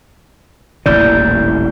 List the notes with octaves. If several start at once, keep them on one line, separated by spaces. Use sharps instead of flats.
D#1 A1 E3 D5 G6